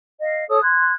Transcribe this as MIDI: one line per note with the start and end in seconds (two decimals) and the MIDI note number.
0.19 0.44 75
0.19 0.44 77
0.48 0.60 69
0.48 0.60 73
0.48 0.60 87
0.62 0.92 84
0.62 0.92 90
0.62 0.92 92